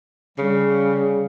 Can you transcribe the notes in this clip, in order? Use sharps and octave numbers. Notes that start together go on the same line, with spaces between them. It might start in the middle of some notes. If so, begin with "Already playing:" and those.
C#3 G3